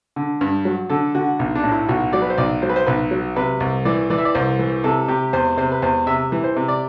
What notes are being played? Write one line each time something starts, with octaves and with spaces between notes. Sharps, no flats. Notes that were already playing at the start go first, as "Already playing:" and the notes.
D3
G2
F#3
D3 A4
D3 F#4
B1
D4
A2
E4
B1 F#4
F#3 D5
B4
C5
B1 D5
F#3 C5
B4
C5
B1 B4
F#3
C3 B4
C2
E3 D5
E3 D5
E5
D5
C2 C5
E3
C3 A4
C3 G4
E2 C5
C3 C5
B4
E2 C5
C3 E5
E3
C5
C3
D5